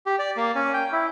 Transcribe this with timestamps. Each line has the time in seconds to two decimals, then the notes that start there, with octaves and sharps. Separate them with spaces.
0.06 G4
0.19 D5
0.37 A#3
0.55 C#4
0.74 G5
0.92 E4